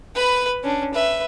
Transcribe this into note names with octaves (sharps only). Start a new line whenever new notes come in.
B4 B5
C#4 D4
B4 E5